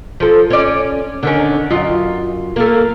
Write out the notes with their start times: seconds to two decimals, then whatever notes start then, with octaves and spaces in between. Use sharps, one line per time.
0.20 F3 A4
0.50 C#4 D5
1.23 D3 D#3 C#4
1.70 F#2 F4 D#5
2.56 A3 A#3